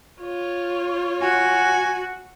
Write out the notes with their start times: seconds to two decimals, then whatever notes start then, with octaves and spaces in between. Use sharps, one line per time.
0.22 F4 C#5
1.22 F#4 G#5